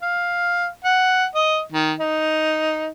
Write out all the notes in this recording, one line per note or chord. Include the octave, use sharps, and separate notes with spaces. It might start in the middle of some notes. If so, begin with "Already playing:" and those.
F5
F#5
D#5
D#3
D#4